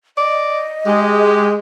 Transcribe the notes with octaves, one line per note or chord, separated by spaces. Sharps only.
D5 D#5
G#3 G4